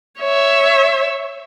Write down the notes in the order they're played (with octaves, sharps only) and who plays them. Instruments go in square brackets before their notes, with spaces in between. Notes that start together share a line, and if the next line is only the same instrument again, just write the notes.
[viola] C#5 E5